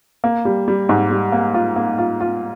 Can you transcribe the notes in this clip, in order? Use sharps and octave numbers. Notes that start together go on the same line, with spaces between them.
A#3
G3
G3
G#2
G3
A#3
F4
A#3
F4
F4